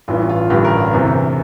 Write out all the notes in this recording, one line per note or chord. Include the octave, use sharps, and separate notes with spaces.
A1 G2 E3 F4
F4
A1 G2 D3 G4
A#4
E1 D2 C3 E3